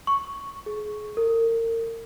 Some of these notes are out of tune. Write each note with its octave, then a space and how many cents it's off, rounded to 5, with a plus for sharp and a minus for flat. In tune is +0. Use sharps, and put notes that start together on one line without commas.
C#6 +0
G#4 +25
A#4 -35